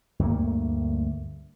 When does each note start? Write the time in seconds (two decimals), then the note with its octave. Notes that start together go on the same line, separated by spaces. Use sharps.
0.19 D2 G2 A3 A#3